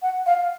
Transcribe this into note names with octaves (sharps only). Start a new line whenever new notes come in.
F#5
F5